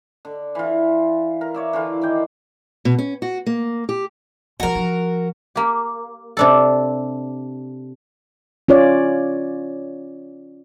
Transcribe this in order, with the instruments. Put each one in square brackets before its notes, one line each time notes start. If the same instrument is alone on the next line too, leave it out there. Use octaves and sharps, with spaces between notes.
[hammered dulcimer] D3
E3 F4
A#4
C#5 D5 E5
D3 E3 F4
D#3 D5 G5
[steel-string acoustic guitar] B2
C#4
F#4
A#3
G4
[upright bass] F3 G3 [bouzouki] F#4 A#4
[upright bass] F3
[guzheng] A#3 G4
C3 D4 A4
[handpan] C#4 F4 C#5 D5